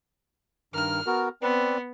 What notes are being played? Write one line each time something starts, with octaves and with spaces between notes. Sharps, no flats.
G2 D#3 A#4 F6
B3 F#4 A#4
B3 C4 B4 D5